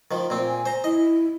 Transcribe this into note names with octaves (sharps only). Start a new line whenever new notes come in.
D#3 F3
A#2 C4
G#5
C5 A#5
E4 D#5